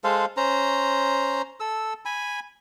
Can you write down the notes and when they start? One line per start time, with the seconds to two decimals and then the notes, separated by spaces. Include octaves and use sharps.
0.04 G#3 A4 C5 F5
0.37 C#4 C5 A#5
1.60 A4 E6
2.05 G#5 B5